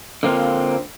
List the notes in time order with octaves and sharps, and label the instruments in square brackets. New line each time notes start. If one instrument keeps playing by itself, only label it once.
[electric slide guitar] D3 A#3 C4 F4